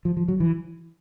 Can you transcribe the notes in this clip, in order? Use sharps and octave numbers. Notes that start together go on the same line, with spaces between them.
F3
F3
F#3
E3